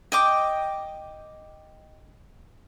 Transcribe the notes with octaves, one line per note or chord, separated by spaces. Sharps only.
D#5 G5 D6